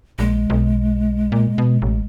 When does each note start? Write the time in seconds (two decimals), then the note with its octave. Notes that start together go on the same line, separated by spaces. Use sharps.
0.19 A#1 G#3
0.50 B1
1.32 A#2
1.58 B2
1.82 A1